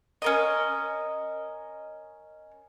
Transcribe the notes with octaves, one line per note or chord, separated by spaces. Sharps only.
C#4 A#4 D#5